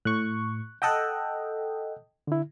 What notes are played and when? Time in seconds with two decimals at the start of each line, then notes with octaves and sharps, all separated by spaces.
0.05 A2 C#6 F#6
0.82 A4 D#5 F#5 G5 E6 F#6
2.27 D3 E4